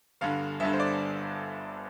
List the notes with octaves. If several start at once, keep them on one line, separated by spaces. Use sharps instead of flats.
G1 G2 D3 F5
G1 G2 D3 E5
C5
D5